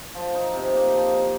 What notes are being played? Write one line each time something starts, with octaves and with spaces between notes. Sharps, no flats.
F3
D#4
C3
A#3
F3
D#4